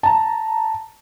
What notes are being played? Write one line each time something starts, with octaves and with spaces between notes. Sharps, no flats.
A5 A#5